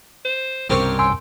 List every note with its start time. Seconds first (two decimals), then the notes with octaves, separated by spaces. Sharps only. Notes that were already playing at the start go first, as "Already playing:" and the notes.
0.24 C5
0.70 C2 G2 C#3 C4 G4 A#4 C#5
0.99 G5 G#5 C6 E6